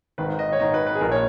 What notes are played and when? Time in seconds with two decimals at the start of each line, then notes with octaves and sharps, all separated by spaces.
0.18 G#1 G#2 D#3 B4
0.39 D#5
0.53 C#5
0.60 G#1 G#2 D#3 D#5
0.74 B4
0.87 B4
0.95 G#4
1.00 A#1 A#2 A#4
1.12 C#5